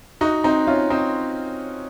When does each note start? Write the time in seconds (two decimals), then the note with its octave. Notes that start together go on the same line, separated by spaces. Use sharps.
0.21 D#4 F#4
0.44 C4 D#4
0.67 C#4 F4
0.90 C4 D#4